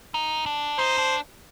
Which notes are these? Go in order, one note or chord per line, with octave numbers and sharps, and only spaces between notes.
D#4
D4
D#4 C5
D4